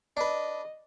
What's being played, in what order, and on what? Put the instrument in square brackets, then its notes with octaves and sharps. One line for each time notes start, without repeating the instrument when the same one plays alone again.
[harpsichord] D4 B4 [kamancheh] D#5